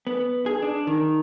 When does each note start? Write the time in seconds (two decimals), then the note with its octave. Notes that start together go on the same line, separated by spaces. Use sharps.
0.07 B3
0.46 G#4
0.62 D4
0.87 D#3